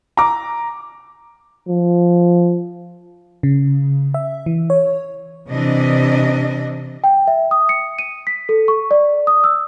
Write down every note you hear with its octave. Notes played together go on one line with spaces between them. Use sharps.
A#5 D6
F3
C#3
E5
E3
C#5
C3 E3 D4 D#5
G5
E5
D#6
C#7
D#7
B6
A4
C#6
D5
D#6
E6